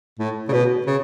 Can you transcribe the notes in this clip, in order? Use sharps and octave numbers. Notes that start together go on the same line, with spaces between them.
A2
C#3
B2
C#3